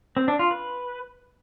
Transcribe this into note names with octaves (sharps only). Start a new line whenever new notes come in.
C4
D4
F4
B4